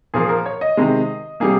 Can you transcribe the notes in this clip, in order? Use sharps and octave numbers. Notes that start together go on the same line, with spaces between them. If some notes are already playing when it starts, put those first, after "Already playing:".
A#2 F3 A#3 G#4
A#4
C#5
D#5
C3 D#3 G#3
C3 G3 A#3 G#4